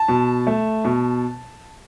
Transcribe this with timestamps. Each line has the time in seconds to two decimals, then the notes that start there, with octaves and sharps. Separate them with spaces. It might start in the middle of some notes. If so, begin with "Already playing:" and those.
Already playing: A5
0.08 B2
0.47 A3
0.85 B2